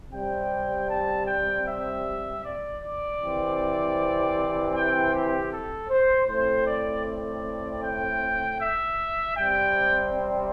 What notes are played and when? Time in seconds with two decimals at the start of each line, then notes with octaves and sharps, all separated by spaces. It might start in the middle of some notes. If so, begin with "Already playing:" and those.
0.12 C3 G3 C4 G5
0.89 A5
1.27 G5
1.66 E5
2.43 D5
2.81 D5
3.19 C3 E3 C4
4.74 G5
5.12 G4
5.51 A4
5.89 C5
6.27 A2 A3 C4 C5
6.67 D5
7.05 D5
7.82 G5
8.59 E5
9.37 C3 G3 C4 G5